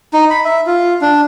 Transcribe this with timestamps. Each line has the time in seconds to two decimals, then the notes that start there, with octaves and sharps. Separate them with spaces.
0.13 D#4
0.30 B5
0.45 E5
0.66 F4
1.01 D4